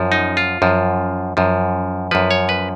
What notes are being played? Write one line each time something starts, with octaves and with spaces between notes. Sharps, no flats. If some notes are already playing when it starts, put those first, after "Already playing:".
Already playing: F#2 F3
D#4
F4
F#2 F3
F#2 F3
F#2 F3 B4
C#5
B4